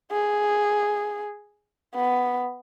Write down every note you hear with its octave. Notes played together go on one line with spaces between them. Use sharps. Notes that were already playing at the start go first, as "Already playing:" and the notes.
G#4
B3